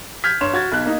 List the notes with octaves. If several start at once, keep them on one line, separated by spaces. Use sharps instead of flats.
F6 G6 G#6 B6
G2 C#5 C6 E7
F#4 G#6 A6
B1 F#6
A#3 D#4